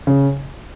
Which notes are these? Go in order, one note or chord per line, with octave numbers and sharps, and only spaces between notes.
C#3